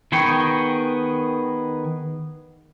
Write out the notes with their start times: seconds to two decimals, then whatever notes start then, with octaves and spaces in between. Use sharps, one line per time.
0.12 D#3 B3 G#4 G5 C#6